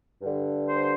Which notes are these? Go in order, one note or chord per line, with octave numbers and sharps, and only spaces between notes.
G2 D3
C5